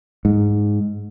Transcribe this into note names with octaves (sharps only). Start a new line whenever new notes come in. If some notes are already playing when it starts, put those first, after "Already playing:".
G#2